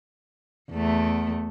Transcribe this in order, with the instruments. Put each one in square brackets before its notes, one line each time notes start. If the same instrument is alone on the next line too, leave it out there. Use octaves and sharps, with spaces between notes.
[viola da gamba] E2 A3